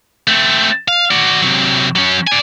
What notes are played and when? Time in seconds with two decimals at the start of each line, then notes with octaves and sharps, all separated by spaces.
0.28 A3 C4
0.88 F5
1.11 F#4 D5
1.42 C3 F#3
1.96 F#3 C#4
2.27 D5 G#5